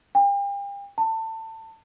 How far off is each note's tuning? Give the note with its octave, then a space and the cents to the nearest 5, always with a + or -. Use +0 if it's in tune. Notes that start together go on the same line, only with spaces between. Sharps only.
G5 +40
A5 +25